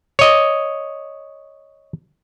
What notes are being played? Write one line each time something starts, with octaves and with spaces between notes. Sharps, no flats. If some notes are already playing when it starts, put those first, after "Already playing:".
C#5 D#5